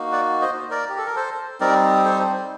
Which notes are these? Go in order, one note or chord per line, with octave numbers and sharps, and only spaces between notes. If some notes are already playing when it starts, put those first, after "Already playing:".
Already playing: A#3 D#4 F#4
D5 F#5
C5 D#5
A#4 D5
G4
A4
A#4
A4 C5
G3 C4 D#4 A#4 D5
A4 C5